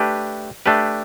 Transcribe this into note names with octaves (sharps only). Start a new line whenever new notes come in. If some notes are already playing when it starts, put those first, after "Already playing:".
Already playing: A3 D4 G4 B4
A3 D4 G4 B4